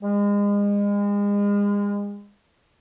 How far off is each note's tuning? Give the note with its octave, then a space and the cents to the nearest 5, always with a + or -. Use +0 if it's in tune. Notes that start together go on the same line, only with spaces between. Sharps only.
G#3 -35